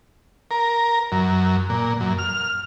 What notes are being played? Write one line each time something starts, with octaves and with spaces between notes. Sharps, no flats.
A#4
F#2
A#2
F#2
F6